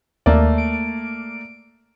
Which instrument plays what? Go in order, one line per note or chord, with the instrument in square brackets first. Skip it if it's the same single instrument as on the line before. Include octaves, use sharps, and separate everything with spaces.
[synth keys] D#2 [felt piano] A3 A#3 D5
[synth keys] D7